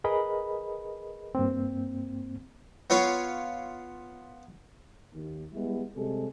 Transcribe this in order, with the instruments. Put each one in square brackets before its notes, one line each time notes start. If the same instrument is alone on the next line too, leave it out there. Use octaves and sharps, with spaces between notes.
[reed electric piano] G#4 A#4 B4 D#5 B5
G2 A#3 C4
[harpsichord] B3 F4 C#5 F5
[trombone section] D#2
G3 G#3 B3 E4
C3 G3 G#3 G#4 A4